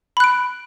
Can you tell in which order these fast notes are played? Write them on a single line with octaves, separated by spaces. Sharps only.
B5 F#6 D7